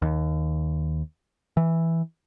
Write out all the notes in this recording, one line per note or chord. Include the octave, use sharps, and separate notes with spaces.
D#2
E3